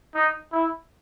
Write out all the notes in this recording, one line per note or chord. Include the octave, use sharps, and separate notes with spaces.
D#4
E4